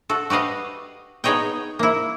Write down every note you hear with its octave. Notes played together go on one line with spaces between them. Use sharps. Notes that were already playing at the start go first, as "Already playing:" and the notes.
F#4 A4
F#4 G4 B4 D#5 F5
B3 D#4 G#4 C#5 D#5 G5
A#3 E4